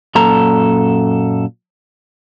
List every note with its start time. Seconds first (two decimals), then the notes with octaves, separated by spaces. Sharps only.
0.15 F#2 A#2 A4 A#5